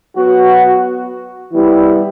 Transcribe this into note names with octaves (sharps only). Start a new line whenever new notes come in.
F#3 B3 F#4
E3 G3 B3 E4